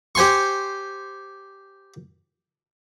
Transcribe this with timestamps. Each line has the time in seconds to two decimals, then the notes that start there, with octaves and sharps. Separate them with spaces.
0.15 G4 C5 G#5 C6 C#6